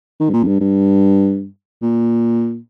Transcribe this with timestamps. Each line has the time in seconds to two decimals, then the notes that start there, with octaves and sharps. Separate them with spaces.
0.20 D#3
0.29 G2
0.33 A#2
0.43 F2
0.47 G2
0.60 G2
1.82 A#2